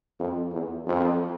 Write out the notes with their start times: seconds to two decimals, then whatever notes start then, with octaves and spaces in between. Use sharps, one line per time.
0.19 F2
0.52 E2
0.87 F2